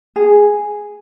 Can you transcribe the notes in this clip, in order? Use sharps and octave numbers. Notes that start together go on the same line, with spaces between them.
G#4